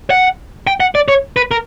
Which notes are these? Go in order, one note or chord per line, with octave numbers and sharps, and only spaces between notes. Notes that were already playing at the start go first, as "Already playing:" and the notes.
F#5
G5
F#5
D5
C#5
B4
A#4